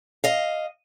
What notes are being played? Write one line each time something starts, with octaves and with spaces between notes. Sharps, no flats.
D#5 F5